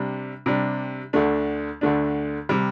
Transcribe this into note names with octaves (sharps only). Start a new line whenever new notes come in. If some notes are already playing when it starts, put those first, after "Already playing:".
Already playing: C3 G3 D4
C3 G3 D4
D2 D3 A3 D4
D2 D3 A3 D4
C3 G3